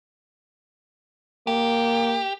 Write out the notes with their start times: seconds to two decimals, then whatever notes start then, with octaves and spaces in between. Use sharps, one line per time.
1.47 A#3 G4